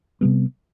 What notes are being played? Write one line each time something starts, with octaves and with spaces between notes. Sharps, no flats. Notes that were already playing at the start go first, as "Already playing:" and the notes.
C3 G3 B3